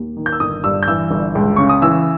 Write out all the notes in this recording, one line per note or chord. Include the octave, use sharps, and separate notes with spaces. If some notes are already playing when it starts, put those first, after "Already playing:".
Already playing: D#2
D#3
G6
E6
G1 D#6
G2 E6
G6
E3 E6
G1
C#2
C#3 C#6
D#6
E3 E6